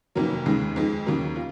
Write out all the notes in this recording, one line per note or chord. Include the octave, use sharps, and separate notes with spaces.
F1 F2 D#3 F#3 A#3
D#2 C#3 G#3
F2 D#3 G#3
D#2 C#3 F#3 A#3
F4